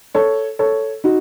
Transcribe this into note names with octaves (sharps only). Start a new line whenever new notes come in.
A4 C#5
A4 C#5
D#4 F#4